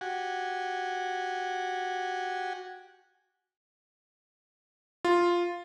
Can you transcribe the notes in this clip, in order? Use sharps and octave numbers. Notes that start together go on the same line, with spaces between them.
F#4 G4 F#5 G#5
F4